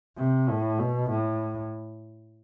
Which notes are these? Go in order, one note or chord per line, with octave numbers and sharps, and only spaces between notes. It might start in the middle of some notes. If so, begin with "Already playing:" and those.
C3
A2
B2
A2